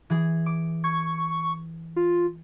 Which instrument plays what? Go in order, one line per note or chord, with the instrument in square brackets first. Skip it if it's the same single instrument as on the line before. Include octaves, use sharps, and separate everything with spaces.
[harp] E3 G#4
D6
[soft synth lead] C#6 [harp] G#6
[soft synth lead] F4